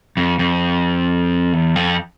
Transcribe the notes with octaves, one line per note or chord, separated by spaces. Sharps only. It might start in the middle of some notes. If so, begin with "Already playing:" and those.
F2
F2
E2
F2